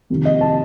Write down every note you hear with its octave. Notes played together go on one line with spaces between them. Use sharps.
F2 C3 D#3
D#5
A5